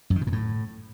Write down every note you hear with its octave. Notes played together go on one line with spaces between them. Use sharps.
F#2
D#3
B2
A#2
A2